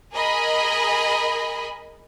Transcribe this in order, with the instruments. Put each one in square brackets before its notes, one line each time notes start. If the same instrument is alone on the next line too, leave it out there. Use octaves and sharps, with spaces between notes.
[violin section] G#4 A#4 D#5 G#5 B5